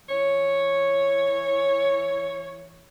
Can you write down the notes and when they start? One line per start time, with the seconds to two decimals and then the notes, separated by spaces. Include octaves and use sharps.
0.09 E3 C#5